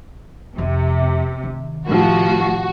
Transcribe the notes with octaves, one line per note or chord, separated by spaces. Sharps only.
F2 C3
D#3
A2 C3 F3 F#4